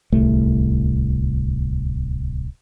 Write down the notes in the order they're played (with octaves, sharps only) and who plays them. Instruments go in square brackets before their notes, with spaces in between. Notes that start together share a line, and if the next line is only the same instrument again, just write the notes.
[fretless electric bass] D1 C2 A3